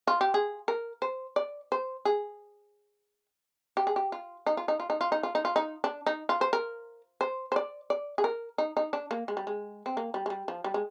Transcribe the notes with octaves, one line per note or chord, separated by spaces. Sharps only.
F4
G4
G#4
A#4
C5
D5
C5
G#4
G4
G#4
G4
F4
D#4
F4
D#4
F4
D#4
F4
D#4
F4
D#4
F4
D#4
D4
D#4
F4
C5
A#4
C5
C5
D5
D5
G#4
A#4
D#4
D#4
D4
A#3
G#3
G3
G#3
C4
A#3
G3
G#3
G3
F3
G3
G#3